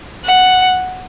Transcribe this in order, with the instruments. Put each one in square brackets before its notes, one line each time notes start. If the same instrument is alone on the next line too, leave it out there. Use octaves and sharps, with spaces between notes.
[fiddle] F#5